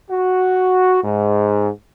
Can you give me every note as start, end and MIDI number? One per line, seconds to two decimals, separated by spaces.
0.10 1.00 66
1.04 1.69 44